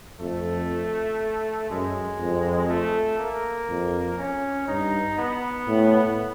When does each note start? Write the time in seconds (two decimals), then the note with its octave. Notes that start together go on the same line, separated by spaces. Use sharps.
0.20 F2 A3
1.70 F#2 G#3
2.19 F2
2.69 A3
3.19 A#3
3.69 F2
4.18 C#4
4.68 G2 D#4
5.18 B3
5.67 A2